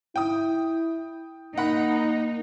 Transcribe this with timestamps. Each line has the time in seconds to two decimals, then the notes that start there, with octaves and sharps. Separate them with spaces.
0.16 E4 G5 D#6
1.58 A#3 D#4 F#5 B5